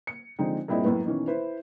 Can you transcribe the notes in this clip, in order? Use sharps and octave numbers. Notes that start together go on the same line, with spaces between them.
C#7
D3 F3 G#3 C4 D#4
G2 A#2 C4 E4 G#4 D#5
F#2 A2 B3
B2 D#3 E3 C#4
E4 B4 C5